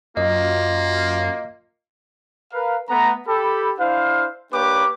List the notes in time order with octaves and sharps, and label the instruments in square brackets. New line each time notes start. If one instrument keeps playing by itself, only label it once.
[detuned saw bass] F#2 [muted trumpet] A#3 [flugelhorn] F4 [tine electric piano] D#5
[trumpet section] A#4 B4 F5
A3 B3 A#5
G4 A4 B5
D4 E4 C5 F5
A#3 D4 G4 B4 C#5 D6